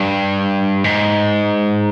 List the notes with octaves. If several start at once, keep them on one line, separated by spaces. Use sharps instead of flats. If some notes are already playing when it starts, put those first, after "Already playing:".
Already playing: G2
G#2